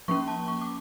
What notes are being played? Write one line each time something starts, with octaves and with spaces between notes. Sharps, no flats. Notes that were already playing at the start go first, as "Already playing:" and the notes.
F3 A#3 C#4 C#6
A5
C#6
D6